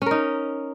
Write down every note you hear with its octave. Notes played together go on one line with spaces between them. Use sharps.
C#4 D#4 A#4